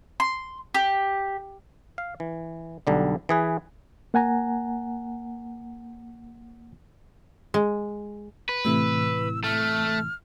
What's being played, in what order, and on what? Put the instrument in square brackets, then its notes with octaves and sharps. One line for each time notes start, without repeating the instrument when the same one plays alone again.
[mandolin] C6
G4
[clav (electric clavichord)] F5
E3
B1 D3 G3
E3 G#4 B4
[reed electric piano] A#3 F#5 G#5 A#5
[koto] G#3
[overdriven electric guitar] B4
[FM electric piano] A2 C3 E3 [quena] E6
[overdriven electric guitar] A3 [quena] F6